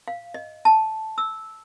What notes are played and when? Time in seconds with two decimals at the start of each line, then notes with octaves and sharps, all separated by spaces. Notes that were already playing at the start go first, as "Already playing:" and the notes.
0.08 F5
0.34 D#5
0.65 A5
1.18 E6